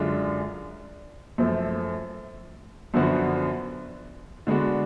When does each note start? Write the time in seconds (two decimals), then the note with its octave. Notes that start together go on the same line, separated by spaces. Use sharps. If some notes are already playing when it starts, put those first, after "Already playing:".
Already playing: F#2 D3 G#3 D4 F4
1.38 F#2 F3 A3
2.94 F#2 D3 F3 B3 F#4
4.47 D3 G#3 B3 D4 F#4